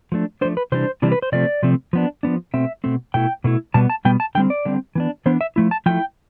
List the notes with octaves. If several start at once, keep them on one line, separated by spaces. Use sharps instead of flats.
F3 A3 D4
F3 A3 D4 C5
B4
C3 E3 G3 D4 C5
C3 E3 G3 D4
B4
C5
C3 F3 A3 C4 D5
C3 F3 A3 C4
F3 B3 D4
F3 B3 D4
B2 A3 C4 E5
B2 A3 C4
B2 A3 E4 G5
B2 A3 E4
B2 G3 B3 A5
A5
B2 G3 B3 G5
A5
D3 G3 C4 G5
D5
D3 G3 C4
E3 B3 D4
E3 B3 D4 C5
E5
F3 A3 E4
A5
F3 A3 E4 G5